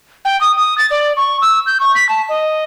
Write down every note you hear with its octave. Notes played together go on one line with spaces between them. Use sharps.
G5
D#6
D#6
A6
D5
C#6
E6
G6
C#6
B6
A5
D#5